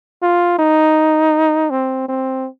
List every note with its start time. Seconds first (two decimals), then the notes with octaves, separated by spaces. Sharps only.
0.22 F4
0.59 D#4
1.70 C4
2.08 C4